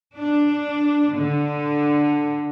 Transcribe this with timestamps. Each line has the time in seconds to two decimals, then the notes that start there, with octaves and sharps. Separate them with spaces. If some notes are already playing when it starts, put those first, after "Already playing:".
0.17 D4
1.14 D3